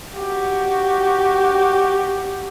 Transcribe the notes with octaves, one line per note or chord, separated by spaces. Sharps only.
F#4 G4